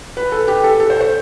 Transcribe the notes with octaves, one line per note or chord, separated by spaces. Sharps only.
B4
A4
G4
A4
A4
C5
C5